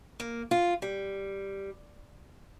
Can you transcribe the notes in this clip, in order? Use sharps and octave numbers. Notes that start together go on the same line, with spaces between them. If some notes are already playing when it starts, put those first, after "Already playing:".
A#3
F4
G3